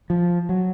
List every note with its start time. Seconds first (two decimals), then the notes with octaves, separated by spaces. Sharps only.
0.10 F3
0.49 F#3